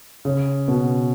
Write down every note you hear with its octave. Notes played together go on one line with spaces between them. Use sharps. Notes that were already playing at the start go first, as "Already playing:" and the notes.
C#3
B2